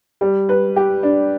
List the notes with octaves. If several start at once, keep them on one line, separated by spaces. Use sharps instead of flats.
G3
B4
G4
D4